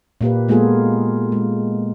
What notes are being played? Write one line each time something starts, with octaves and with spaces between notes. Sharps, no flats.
A#2 A#3 G4 B4
G#3 A#3 B3 F4 G#4 A4
G#3